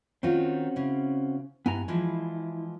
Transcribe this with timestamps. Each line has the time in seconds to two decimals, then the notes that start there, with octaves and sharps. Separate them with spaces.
0.23 D#3 C4 C#4 D#4 F4 F#4
0.76 C#3 E4
1.66 G2 B3 E4 G#5 A#5
1.88 E3 F3 G#3 E4